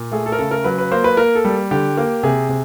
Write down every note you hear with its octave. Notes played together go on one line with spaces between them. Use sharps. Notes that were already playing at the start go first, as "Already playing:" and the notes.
Already playing: A#2
A3 G#4
A4
A#4
C#3 A4
A#4
F#3 B4
B4
A#3 C5
B4
A#3 A#4
A4
G3
D3 G4
A#3
C3 G#4
C3